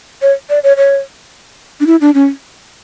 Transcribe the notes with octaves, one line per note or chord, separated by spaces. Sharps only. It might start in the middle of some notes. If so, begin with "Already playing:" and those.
C#5
D5
C#5
C#5
D4
E4
D4
C#4